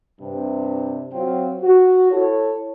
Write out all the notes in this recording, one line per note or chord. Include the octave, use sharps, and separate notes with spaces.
G2 C3
F#3 C4 F4
F#4
E4 A4 C#5